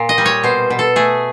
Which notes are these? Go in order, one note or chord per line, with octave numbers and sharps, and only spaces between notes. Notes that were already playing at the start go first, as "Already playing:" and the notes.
Already playing: A#2
D#5
G3
C#5
B2 C5
B2
A4
A3 G#4